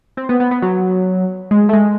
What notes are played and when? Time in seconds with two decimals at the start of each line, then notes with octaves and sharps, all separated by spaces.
0.17 C4
0.29 B3
0.40 B3
0.51 B3
0.62 F#3
1.51 G#3
1.69 A3
1.73 G#3